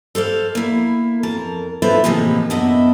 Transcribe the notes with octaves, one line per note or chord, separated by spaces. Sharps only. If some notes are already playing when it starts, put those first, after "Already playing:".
A4 C5 D5 F5
A#3 E4
F2 A#4 A5
D4 E4 F4 A4 B4 C5
A2 C3 E3 F3 G#3 A#3
F#2 B3 D4 E4 D#5 E5